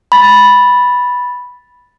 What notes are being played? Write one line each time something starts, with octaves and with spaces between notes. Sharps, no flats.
B5 A6